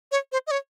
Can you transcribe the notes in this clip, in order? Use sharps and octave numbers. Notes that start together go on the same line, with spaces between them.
C#5
C5
D#5
C#5